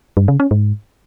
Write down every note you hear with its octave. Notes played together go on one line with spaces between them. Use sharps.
G2
C#3
C#4
G#2